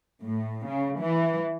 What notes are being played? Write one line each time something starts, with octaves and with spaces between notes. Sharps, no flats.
A2
C#3
E3